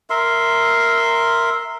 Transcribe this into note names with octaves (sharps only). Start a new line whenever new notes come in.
A#4 E5 C6